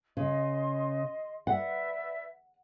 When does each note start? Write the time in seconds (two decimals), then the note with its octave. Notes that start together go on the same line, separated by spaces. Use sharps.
0.17 C#3 D#5 C6
1.47 B4 D5 E5 F#5